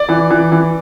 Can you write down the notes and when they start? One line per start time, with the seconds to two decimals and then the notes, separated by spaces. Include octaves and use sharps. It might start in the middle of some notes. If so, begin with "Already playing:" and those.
Already playing: D5
0.09 E3
0.30 E3
0.52 E3